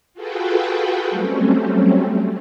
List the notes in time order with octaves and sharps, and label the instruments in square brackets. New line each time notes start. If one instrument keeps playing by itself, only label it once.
[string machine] F4 F#4 G#4 A4 B4 G5
F#3 G3 A3 C4 C#4